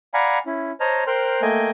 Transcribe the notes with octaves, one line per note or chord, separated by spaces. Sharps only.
D5 F5 F#5 G#5 A#5 B5
C#4 E4
C5 C#5 D#5 A5 A#5 F6
A#4 C5 G5 C6 F6 F#6
A3 A#3 D#5 G5 G#5